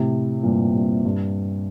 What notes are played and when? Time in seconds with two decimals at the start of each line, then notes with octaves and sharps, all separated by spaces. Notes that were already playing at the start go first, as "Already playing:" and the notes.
Already playing: A2 C3
0.43 G2 A#2
0.74 G2
1.05 G2